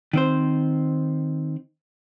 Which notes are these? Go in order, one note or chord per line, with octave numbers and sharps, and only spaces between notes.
D#3 C4 C5